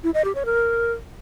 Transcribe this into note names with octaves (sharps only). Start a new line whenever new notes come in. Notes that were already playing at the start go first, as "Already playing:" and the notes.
E4
D#5
G4
C#5
A#4